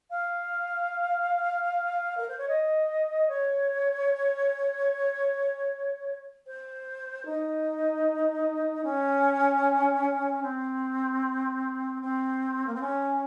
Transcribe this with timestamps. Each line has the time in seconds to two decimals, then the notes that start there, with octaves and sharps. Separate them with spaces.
0.10 F5
2.17 A#4
2.28 C5
2.38 C#5
2.48 D#5
3.28 C#5
6.46 C5
7.25 D#4
8.83 C#4
10.42 C4
12.01 C4
12.66 A#3
12.74 C4
12.80 C#4